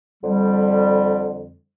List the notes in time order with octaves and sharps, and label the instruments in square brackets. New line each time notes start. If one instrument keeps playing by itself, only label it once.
[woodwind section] F2 D3 G3